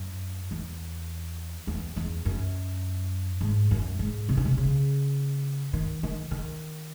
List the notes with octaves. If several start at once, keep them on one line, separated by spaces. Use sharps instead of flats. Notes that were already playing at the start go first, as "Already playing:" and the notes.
Already playing: F#2
E2
E2
E2
F#2
G#2
F#2
G#2
C3
C#3
C3
C#3
D#3
D#3
D#3